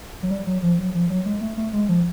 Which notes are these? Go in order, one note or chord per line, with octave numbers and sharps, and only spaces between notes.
F#3
G3
F#3
F3
F#3
F3
F#3
G#3
A3
A3
G#3
F3